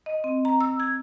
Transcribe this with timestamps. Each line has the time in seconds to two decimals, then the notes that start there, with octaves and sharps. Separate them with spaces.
0.06 D#5
0.24 C4
0.45 A#5
0.61 E6
0.80 G#6